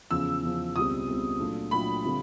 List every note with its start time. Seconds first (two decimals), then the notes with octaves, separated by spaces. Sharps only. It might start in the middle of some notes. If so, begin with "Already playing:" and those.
0.11 E2 C#3 F3 E6
0.43 E2 C#3 F3
0.75 C#2 B2 G3 C4 D#6
1.07 C#2 B2 G3 C4
1.39 A#2 F#3 A3 D4 F4
1.71 A#2 F#3 A3 D4 F4 B5
2.04 D3 G3 C4 F4